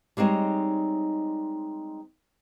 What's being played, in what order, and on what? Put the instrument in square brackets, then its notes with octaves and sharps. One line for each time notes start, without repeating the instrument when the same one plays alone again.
[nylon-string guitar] G3 G#3 C4 D#4 C#5